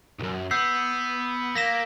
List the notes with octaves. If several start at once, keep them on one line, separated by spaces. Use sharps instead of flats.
B1 F#2
B3 E6 G6 C7
A#3 A#6 B6 E7